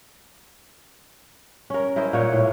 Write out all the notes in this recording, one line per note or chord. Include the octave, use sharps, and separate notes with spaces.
C#4 A#4
E4 A#4 C5 D#5
A#2 C#5 F#5
A2